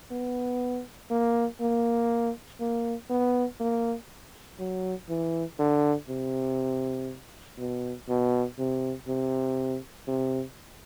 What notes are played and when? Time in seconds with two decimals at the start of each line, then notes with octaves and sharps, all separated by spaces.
0.11 B3
1.11 A#3
1.60 A#3
2.60 A#3
3.10 B3
3.60 A#3
4.59 F#3
5.09 E3
5.59 D3
6.09 C3
7.58 B2
8.09 B2
8.59 C3
9.08 C3
10.08 C3